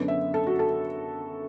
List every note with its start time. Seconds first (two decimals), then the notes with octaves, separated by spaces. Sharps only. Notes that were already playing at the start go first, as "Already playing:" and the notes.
Already playing: F#2 D3 B3
0.08 E5
0.34 A4
0.47 F#4
0.59 A4